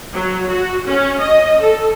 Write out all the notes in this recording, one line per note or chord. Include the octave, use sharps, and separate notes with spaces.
F#3
F#4
C#4
D#5
A4